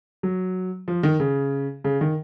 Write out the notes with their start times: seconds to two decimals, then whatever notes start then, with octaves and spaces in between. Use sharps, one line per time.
0.23 F#3
0.88 F3
1.03 D#3
1.20 C#3
1.84 C#3
2.01 D#3